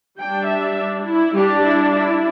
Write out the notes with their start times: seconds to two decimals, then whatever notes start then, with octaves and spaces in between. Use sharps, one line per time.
0.19 G3 D4 G5
0.48 E5
1.07 E4
1.36 G3 D4 G4
1.65 E4
1.94 E4